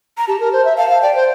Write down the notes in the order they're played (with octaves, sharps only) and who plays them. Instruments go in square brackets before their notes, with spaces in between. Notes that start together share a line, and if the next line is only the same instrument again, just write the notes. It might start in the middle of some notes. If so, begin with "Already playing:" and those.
[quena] A#5
[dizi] G4 [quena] A5
[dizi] A#4
C5
E5
[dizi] F5 [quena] A5
[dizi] F5
[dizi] D5 [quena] G5
[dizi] C5